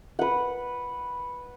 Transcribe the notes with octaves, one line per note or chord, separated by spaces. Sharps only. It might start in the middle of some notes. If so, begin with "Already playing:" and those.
B4 F#5